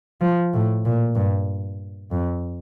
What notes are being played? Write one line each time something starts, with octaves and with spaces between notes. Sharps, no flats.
F3
A2
A#2
G2
F2